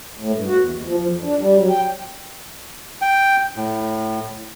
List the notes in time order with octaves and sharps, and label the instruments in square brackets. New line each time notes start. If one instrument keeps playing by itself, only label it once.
[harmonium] A2
G2
F#4
E2
D#2
F3
F3
F2
D4
G3
F#3
G5
[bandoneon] G5
A2